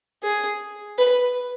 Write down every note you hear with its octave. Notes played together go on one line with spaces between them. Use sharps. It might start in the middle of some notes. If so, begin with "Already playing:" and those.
G#4
B4